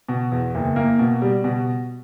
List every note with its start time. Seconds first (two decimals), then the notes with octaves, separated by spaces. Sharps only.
0.09 B2
0.32 E2
0.55 F#1
0.76 A#3
0.99 B2
1.22 G3
1.44 B2